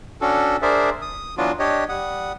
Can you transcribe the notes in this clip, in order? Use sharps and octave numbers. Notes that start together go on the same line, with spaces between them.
C#4 D4 F#4 A4
D4 G#4 A#4 C5 D5 E5
D#6
E3 F#3 B3 D4 F4 F#4
D4 G4 C#5 D#5
G3 F#5 D#6